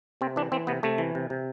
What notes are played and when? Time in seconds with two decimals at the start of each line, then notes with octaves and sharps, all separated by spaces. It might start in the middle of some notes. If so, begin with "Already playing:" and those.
0.21 C3 C4
0.36 E3 D4
0.52 E3 C4
0.67 C3 B3
0.83 C3 A3
0.98 E3
1.15 C3
1.30 C3